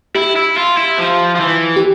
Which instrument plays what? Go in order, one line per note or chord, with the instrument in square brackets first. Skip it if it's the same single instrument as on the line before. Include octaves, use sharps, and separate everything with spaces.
[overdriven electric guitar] E4 [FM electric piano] G4
[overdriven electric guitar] E4
F4
E4
F3
F3
E3
[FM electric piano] G4